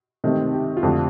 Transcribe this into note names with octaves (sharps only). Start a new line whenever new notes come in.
C3 D#3 A3 C4
G4
F4
F2 D3 A3 G4